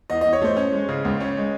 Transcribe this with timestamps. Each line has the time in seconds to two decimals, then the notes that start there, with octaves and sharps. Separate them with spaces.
0.10 E2 D#5
0.21 E2 D#5
0.33 C#5
0.42 A3 C5
0.57 C#4
0.72 G#3
0.89 C#3
1.05 C#2
1.20 C#4
1.37 G#3